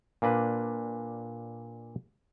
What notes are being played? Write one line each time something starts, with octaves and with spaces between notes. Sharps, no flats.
A#2 A#3 D4 B4